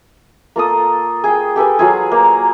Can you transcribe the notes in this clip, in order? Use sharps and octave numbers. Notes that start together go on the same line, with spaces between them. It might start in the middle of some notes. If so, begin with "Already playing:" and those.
A#3 F4 A4 D#6
G#4 G5
G4 A4 B4 G#5
F#3 F4 G#4
A#3